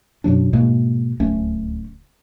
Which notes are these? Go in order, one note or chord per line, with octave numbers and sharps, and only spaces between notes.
F#2 B2 F#3 D4
G#2 B2 G#3 A#3
D1 C#2 A3 C#4